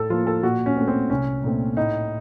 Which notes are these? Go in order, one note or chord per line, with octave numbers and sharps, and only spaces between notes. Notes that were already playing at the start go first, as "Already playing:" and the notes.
Already playing: A2 A4
F3 A#3 F4
A4
A#2 F#4
C#4
C4
A3
C4
C2 C#4
A#2 A3 C4
A2 D#4